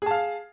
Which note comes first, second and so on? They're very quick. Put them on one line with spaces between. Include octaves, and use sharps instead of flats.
G#4 A5 F5